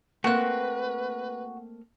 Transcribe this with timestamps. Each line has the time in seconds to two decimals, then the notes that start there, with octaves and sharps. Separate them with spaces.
0.24 A3 A#3 C4 F#4 B4 F#6